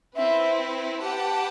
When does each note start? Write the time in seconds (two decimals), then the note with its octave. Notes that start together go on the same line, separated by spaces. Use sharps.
0.15 C4 E4 B4 E5
1.01 G4 B4 F#5 A5